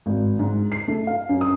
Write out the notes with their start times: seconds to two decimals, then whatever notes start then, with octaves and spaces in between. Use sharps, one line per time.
0.06 G#1
0.39 G#2
0.72 C7
0.88 A3
1.07 F5
1.29 F#2
1.41 D#6